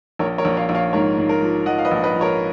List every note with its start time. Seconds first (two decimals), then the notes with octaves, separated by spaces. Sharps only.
0.19 A#1 A#4 C#5
0.38 A#4 C#5
0.45 A#1
0.57 C#5 F5
0.69 A#1
0.74 C#5 F5
0.93 G#2 A#4 C#5
1.18 G#2
1.29 A#4
1.42 F3
1.66 F3 D#5 F#5
1.78 F5
1.85 B4 D#5
1.91 A#1
2.04 B4 D#5
2.15 F3
2.21 A#4 C#5